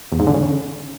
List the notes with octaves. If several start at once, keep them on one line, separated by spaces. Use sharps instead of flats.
E2
G#2
D3
C#3